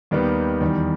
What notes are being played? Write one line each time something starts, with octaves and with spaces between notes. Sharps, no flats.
D#2 D#3 G3 B3
E2 D#3 G3